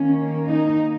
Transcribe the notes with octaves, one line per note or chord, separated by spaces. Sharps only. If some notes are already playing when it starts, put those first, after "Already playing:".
Already playing: D#3 A#3 C#4
D#4